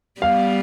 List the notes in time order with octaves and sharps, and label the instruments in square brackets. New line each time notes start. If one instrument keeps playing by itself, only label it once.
[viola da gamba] G3 B3 [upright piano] F5